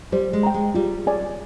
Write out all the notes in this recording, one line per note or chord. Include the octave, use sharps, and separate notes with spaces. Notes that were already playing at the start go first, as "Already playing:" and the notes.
G3 C5
G#3
G5 A#5
G#3
G3 F4
G#4 D5 G#5